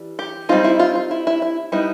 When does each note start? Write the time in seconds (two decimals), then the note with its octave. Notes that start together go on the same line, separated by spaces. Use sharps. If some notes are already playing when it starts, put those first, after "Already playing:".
Already playing: E3 G3
0.19 G4
0.49 G3 C4 D#4 F4
0.64 E4
0.79 F4
0.95 F4
1.11 E4
1.27 E4
1.42 E4
1.72 G3 B3 D#4 E4